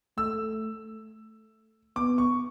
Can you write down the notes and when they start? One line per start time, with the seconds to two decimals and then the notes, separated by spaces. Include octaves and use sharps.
0.17 A3 E6
1.96 B3 D6
2.18 C#6